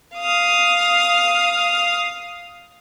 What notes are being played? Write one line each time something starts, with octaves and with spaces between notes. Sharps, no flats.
F5 D#6